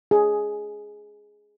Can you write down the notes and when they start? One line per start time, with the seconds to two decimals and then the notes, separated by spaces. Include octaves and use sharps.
0.11 G#4